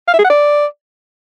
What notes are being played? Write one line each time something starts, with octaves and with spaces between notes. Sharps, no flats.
F5
E5
G#4
F#5
D5